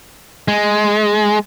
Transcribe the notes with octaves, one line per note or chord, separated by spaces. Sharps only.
G#3